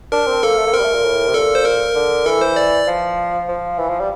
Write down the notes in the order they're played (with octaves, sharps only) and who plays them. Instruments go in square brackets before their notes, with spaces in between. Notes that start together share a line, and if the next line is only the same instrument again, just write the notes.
[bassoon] D4 [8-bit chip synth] A#4
[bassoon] C4
[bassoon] A#3 [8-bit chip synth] A4
[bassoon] A3
A#3
[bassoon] C4 [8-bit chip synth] A#4
[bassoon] G3
A3
A#2
A2
C3
[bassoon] A#2 [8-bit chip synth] A4
[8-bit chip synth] C5
A#4
[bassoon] D3
[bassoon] E3 [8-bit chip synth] A4
[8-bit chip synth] C5
D5
[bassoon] F3
F3
E3
F3
G3